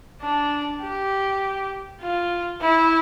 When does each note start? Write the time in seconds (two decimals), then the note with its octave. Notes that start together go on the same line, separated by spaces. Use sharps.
0.21 D4
0.81 G4
2.01 F4
2.62 E4